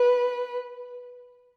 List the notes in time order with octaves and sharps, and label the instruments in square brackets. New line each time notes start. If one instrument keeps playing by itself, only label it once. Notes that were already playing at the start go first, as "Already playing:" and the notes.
Already playing: [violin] B4